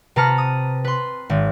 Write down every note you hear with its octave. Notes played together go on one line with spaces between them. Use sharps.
C3 B4 A5 A#5 F6 C#7
D#6
B4 C6
G#1